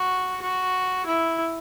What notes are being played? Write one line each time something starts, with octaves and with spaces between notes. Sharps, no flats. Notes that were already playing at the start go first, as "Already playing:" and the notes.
Already playing: F#4
F#4
E4